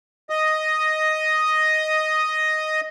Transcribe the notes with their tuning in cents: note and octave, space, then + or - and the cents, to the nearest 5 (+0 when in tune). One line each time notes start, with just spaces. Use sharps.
D#5 +0 D#6 +0